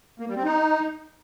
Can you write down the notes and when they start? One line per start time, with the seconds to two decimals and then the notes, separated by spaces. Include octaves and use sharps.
0.20 A#3
0.28 G3
0.36 C4
0.44 D#4